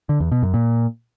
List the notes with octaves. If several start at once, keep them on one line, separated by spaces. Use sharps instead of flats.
D3
E2
B2
F#2
A#2